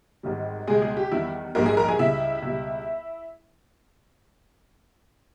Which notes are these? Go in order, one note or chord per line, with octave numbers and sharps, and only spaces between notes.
G#1 G#2 D#3 G3
C#2 B2 G3 G#3 G#4
G#3 G#4
G4
E2 D#3 G3 E4
A#1 G#2 G3 A#3 A#4
G#4 G#5
A#4 A#5
G#4 G#5
C#2 C#3 G3 E4 E5
C#2 B2 G3